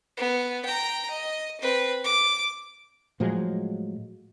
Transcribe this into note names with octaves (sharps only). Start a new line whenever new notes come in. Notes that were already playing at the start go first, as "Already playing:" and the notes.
B3
G5 A#5
D#5
C4 B4
D6
A2 F3 F#3 G#3